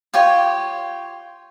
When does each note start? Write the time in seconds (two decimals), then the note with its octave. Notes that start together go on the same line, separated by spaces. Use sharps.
0.14 F4 G4 C#5